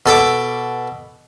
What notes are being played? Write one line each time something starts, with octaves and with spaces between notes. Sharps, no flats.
B2 A4 E5 D6